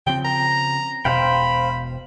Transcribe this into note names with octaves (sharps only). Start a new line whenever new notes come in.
C#3 F3 C4 G5
A#5
E1 B2 C5 F5 G5 B5